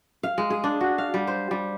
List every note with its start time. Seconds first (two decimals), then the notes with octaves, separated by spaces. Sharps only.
0.23 F5
0.38 G#3
0.50 G#4
0.64 D4
0.81 F#4
0.98 F5
1.14 G3
1.27 C5
1.51 G3